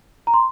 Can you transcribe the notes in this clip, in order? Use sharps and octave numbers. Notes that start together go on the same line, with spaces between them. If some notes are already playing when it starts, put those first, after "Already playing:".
A#5
C6